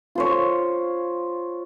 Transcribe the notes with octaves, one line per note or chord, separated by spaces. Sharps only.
F4 C5 C#5